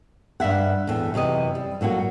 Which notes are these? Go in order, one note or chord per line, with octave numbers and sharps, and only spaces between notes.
G2 F3 E5 F#5
E2 A2
F#2 C3 E3 D#5
G3
A2 F#3 A#3 F#4